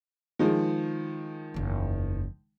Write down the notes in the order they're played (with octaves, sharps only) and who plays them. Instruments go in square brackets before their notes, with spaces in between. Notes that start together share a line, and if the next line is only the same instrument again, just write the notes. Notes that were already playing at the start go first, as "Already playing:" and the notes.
[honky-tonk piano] D#3 F3 G#3
[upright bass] F#1 E2